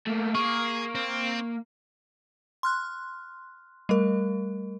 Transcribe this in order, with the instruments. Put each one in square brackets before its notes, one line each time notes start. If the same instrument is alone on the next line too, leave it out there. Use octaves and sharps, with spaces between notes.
[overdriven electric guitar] A3 A#3
[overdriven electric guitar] A#3 [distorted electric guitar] G#4 [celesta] C#6
[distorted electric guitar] C4
[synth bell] C6 F6 F#6
G3 A3 A#4